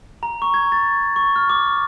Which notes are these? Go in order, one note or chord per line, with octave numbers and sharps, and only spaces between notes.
A#5
C#6
G#6
A6
C#6
F6
D6